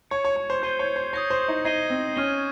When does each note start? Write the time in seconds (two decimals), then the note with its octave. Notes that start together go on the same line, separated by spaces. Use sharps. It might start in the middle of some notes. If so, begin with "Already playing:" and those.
0.11 C#5 C#6 G#6 C#7
0.25 C#5
0.36 C#5
0.50 C5
0.62 C5 G6 C7 D#7 G7
0.79 C#5
0.96 C5
1.13 C#5 D#6 G6 A#6
1.30 C5
1.48 D#4
1.65 D#4 G#6 C7 D#7 G7
1.90 C4
2.16 C#4 C#6 F6 C7 D#7 G7